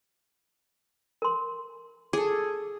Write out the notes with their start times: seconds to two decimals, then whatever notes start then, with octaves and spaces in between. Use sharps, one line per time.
1.22 A#4 C6
2.13 G#4 A4 D6